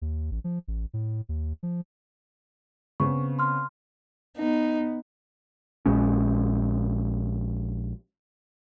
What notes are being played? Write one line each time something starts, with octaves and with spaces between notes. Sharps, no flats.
D#2
A1
F3
A1
A2
D#2
F3
C#3 B3 C4 C#6
C6 F6
B3 D#4
A#1 G#3 C#4